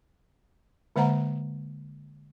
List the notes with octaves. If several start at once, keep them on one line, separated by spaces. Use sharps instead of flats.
D3 G#3 A#3 C5 F#5 A#5